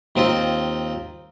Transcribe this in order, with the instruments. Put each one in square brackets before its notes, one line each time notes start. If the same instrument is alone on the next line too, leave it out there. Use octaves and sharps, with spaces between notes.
[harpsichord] D#2 C4 D#4 F4